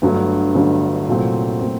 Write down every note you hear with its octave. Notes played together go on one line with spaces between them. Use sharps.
G1 G2 D3 F#3 A3
G1 G2 D3 F#3 A3
C2 A#2 F#3 A3 C4
A#2 F#3 A3 C4